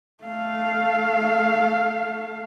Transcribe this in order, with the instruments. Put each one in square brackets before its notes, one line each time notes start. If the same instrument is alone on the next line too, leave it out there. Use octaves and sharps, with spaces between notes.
[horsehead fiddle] A3 F5